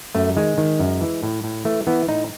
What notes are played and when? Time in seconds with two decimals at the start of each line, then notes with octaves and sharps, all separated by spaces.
0.15 F#2 A3
0.36 D#3 G#3
0.58 D#3
0.79 F#2
1.01 E3
1.23 A2
1.44 A2
1.65 E3 A3
1.87 E3 B3
2.09 A2 D#4